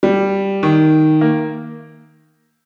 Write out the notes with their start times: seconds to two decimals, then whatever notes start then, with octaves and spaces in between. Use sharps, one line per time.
0.03 G3
0.63 D#3
1.21 A#3